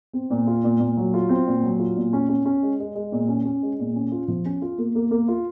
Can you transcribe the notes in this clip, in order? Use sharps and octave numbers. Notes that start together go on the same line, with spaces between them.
C4
A#2
F4
A#2
A#2
F#3
F4
C4
A#2
F#3
F4
A#2
C#4
C#4
C#4
G#3
G#3
G#3
A#2
C#4
C#4
G#3
A#2
C#4
F4
F3
C#4
F4
A#3
A#3
A#3
F4